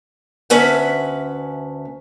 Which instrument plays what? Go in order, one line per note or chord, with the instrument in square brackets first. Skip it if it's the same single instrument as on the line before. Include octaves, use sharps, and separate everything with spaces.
[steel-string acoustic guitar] D2 C#4 B4 E5 F#5